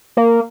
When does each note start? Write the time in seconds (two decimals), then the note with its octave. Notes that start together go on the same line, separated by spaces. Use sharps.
0.17 A#3